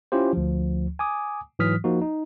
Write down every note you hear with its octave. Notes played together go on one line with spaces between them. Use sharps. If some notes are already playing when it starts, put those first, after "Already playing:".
C#4 E4 F4 G4 C5
D2 F3
G#5 D6 D#6
G#2 E3 F#3 D#6 F6 B6
F3 A#3 D#4 F#4
D#4